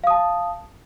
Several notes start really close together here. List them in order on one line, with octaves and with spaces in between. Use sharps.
F5 D#6 A5